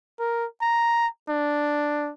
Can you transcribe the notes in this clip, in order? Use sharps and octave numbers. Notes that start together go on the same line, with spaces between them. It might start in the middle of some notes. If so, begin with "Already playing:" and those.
A#4
A#5
D4